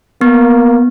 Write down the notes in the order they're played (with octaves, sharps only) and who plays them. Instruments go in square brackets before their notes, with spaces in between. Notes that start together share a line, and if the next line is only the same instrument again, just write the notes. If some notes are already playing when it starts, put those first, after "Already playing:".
[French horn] A#3 [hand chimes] B3